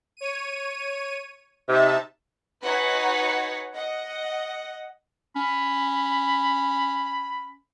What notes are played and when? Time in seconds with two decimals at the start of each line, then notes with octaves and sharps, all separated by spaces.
0.17 C#5 D#7
1.68 C3 D#4 E5 A5
2.63 D#4 F#4 B4 C#5 F#5 G#5
3.74 D#5 F#5
5.36 C#4 B5